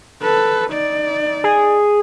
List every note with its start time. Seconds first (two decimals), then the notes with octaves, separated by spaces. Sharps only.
0.22 A4 B4
0.71 D#4 D5
1.44 G#4